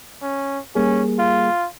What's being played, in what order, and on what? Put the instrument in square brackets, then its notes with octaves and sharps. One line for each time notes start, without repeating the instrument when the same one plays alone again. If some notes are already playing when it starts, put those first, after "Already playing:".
[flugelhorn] C#4
[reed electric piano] G3 A#3 G#4 [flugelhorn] C#4
[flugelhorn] F4